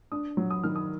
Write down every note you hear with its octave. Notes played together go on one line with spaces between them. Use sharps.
D4 D#6
F#3
D#6
D#3 F6
D#6